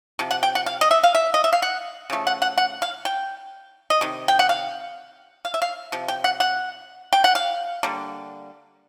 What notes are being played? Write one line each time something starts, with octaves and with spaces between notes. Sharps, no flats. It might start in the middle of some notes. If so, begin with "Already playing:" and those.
C3 F3
F#5
G5
F#5
F5
D#5
E5
F5
E5
D#5
E5
F5
F#5
C#3 F3 A3
F#5
F#5
F#5
F5
G5
D#5
C3 D#3
G5
F#5
F5
F5
E5
F5
C3 F3
G5
F#5
F#5
G5
F#5
F5
D3 G3 A#3